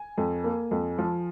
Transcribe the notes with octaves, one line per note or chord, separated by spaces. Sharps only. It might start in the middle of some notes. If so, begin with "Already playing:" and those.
Already playing: G#5
F2
A#3
F2
F3